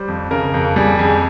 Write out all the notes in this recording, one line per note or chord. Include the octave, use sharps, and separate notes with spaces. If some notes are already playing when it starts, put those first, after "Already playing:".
Already playing: G3 C5
F2
C#3 A#4
F2
G3 G#4
F2 G#4